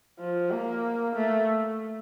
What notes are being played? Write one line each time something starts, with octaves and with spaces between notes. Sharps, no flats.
F3
A#3
A3